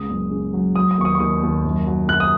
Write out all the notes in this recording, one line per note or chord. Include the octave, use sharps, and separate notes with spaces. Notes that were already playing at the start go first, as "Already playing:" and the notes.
Already playing: C#2 C#3 D#6
F#1
C#3
F#3
F#3 D#6
D#6
D#2 C#6
D#6
C#6
D#2 D#6
D#2
F#2
F#3
F#2 F#6
D#6